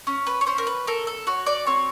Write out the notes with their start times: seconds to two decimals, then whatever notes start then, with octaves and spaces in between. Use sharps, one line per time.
0.07 C#4
0.27 B4
0.41 C#5
0.46 C#4 C5
0.58 A#4
0.67 B4
0.87 A4 A#4
1.07 A4
1.27 F#4 C#5
1.47 D5
1.66 C4 C#5